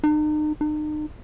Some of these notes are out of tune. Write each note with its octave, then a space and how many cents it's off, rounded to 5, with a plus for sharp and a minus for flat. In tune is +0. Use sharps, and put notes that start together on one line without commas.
D#4 -40
D#4 -40